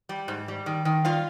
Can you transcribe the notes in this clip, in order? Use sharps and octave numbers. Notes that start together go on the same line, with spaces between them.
G3
G#2
G3
D#3
D#3
G3 F4 F5